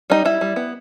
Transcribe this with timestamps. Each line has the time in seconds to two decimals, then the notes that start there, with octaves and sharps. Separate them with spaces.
0.10 G3 D#4
0.25 G3 E4
0.41 G3
0.56 B3